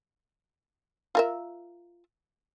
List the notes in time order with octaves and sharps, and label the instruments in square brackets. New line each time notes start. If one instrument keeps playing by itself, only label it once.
[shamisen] F4 A#4 E5